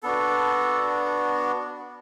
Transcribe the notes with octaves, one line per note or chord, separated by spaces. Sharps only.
B3 D4 F#4 A4